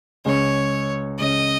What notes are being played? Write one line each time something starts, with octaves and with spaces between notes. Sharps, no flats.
C#2 C#3 G#3 C#4 C#5
C#2 C#3 G#3 C#4 D#5